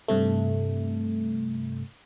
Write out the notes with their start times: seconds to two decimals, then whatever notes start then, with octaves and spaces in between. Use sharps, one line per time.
0.08 G2 C3 A3